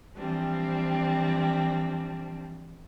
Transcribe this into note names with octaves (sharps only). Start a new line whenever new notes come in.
E3 F3 G3 C4 D4